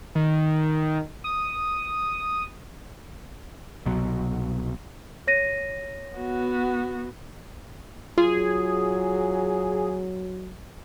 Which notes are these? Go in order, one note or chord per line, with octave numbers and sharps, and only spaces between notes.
D#3
D#6
C2 B2 F#3
C#5 A#6 D#7
B3 F#4
F#3 F4 G#4